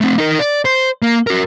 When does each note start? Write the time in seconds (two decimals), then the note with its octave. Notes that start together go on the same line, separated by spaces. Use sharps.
0.01 A3 C4
0.18 D#4 A#4
0.39 D5
0.65 C5
1.02 A#3
1.27 F#4 A#4